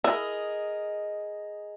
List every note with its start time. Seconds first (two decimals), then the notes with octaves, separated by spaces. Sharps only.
0.04 E4 G#4 A#4 D#5